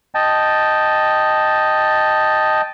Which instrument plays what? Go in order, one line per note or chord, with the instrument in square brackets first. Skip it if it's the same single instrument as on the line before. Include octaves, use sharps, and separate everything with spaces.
[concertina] D#5 G5 A5